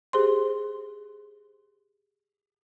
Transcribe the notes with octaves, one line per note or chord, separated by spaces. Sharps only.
G4 G#4 C5 C6